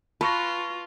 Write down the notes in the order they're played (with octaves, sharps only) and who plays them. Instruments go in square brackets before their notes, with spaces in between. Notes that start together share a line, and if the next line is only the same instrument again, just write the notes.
[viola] F4 [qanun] B4 [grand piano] A5 C#6 A#6